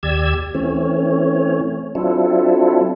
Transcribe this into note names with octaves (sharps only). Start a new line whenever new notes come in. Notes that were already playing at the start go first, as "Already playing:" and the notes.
D#2 G4 D5 E6 G#6
E3 A3 C4 C#4 C#5
F#3 C4 D4 E4 F4 A4